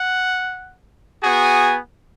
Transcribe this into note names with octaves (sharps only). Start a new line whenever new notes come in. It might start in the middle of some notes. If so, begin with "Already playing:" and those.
Already playing: F#5
B3 F#4 G#4 G#5